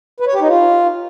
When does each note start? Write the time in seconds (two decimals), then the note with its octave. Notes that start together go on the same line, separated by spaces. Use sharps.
0.20 B4
0.27 C#5
0.34 G4
0.41 D#4
0.48 F4